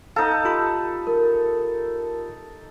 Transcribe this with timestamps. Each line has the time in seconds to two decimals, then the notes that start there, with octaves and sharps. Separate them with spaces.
0.16 D#4 A4 F5
0.45 F4 G4 B5
1.07 A#4